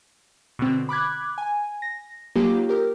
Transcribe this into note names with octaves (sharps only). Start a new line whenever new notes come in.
B2 D3 C4
B5 D6 F#6 G#6
G#5
A#6
F#3 A#3 D#4 F4 G4
G4 A#4